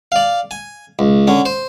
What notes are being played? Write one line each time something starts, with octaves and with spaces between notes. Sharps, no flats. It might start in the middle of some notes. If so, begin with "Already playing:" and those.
D5 F5
G#5
C#2
D3 C#4
C5